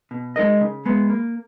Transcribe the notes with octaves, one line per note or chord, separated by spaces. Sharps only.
B2
G#3 D#4 A#4 D#5
C#3
G#3 B3
A#3